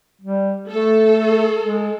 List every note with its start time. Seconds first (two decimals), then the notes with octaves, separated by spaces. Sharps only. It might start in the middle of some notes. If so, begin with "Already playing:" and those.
0.21 G3
0.69 A3 A4
1.60 G#3